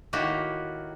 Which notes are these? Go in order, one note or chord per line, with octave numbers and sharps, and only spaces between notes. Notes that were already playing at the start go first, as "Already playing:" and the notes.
A2 D#3 A#3 F#4 G4